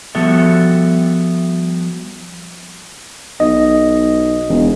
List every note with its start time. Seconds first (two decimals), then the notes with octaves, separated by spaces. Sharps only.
0.15 F3 G3 B3 F#4 A4 E5
3.40 B1 D#5
4.49 E1